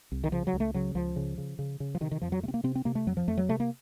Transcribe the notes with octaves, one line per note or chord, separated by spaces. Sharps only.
C2
D#3
C#3 F3
F#3
C#2
A3
C#3 F#3
C#2 F3
C#3
C#3
C#3
C#3
F3
C3 D#3
D#3
F2 F3
F#3
C3 A3
C4
A#3
C3 C4
C4
C3 A#3
A3
F2 F#3
F3
F2 A3
F#3
C3 A3
A#3